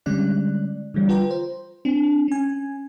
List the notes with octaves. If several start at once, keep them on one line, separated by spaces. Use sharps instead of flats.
D3 G3 G#3 C#4 D5 F#6
D3 E3 G3
F4 B4 G5 A#5
C5
C4 D4
C#4 G#5